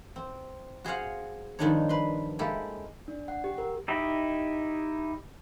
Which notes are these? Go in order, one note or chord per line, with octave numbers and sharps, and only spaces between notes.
C4
F#4 G#4 C5 F5 F#5
G2 D#3 F3 D4 D#4 C#5
B4 C6
G#3 A#3 E4 G4 A4
D4
F#5
G4
A#4
D#4 E4 G4 D#5